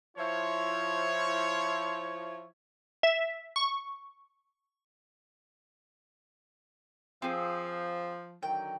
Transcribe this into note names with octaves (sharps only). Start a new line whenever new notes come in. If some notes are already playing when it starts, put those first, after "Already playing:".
F3 E4 C#5
E5
C#6
F3 C4 G#4
D3 D#3 F#3 G5